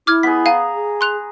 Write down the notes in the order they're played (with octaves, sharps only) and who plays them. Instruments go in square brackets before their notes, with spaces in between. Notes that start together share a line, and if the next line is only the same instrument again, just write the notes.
[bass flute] E4 [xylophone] D6 F6 G#6
[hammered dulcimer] B3 G#4 [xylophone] B6
[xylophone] F5 G#5 [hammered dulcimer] A#5
[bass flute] G#4
[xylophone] C6 F#6 F7